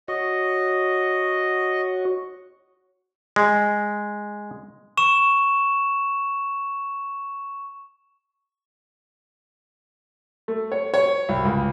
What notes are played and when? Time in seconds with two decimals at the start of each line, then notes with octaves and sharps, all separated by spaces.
0.08 F#4 C#5 D#5
3.36 G#3
4.97 C#6 E7
10.48 A3
10.72 C#5
10.94 C#5
11.29 C2
11.45 C#2